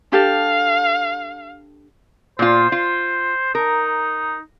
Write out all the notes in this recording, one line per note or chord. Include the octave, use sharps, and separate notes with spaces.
D4 G4 A4 F5
A#2 F4 C5
F4
D#4 A#4